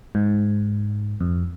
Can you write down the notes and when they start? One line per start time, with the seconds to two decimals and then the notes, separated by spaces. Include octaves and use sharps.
0.15 G#2
1.20 F2